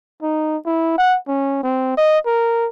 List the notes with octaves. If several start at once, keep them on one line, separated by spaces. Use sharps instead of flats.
D#4
E4
F#5
C#4
C4
D#5
A#4